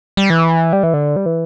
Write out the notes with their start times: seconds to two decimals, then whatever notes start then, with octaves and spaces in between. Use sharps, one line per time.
0.17 G3
0.30 E3
0.73 G3
0.83 E3
0.94 D3
1.16 G3
1.26 E3